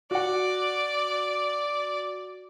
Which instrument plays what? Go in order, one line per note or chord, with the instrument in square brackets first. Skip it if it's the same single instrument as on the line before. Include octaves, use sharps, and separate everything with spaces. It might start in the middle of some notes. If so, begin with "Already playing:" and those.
[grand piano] F#4 F#5 [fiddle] D5